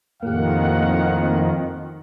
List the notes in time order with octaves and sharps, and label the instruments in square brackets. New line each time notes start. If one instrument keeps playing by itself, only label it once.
[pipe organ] F2 D#3 [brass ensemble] A2 F5 F#5 [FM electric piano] A#3 G4